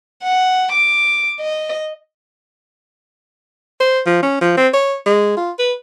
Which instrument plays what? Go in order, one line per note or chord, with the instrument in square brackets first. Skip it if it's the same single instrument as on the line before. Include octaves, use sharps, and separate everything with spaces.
[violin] F#5
D6
D#5
[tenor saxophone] C5
F3
C#4
F3
C4
C#5
G#3
F4
B4